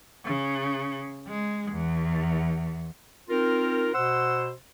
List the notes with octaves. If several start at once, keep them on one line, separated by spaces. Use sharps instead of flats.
C#3
G#3
E2
C4 D#4 F4 A#4
B2 C5 F#5 C6 E6